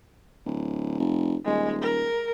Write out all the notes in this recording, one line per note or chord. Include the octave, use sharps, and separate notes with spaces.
D1
F1
D#1 G#3
A#4